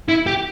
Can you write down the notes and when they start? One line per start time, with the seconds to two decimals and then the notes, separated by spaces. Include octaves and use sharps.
0.09 E4
0.27 G4